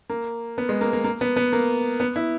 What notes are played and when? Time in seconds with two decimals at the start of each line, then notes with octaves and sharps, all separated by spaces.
0.09 A#3
0.58 B3
0.69 G#3
0.81 A#3
0.93 A#3
1.04 A#3
1.21 B3
1.36 B3
1.52 A#3
2.00 B3
2.16 E4